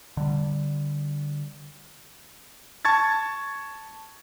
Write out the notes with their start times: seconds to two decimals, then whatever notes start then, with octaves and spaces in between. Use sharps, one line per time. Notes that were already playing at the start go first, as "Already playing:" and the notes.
0.17 D3 G3
2.85 A5 C#6 G#6 A6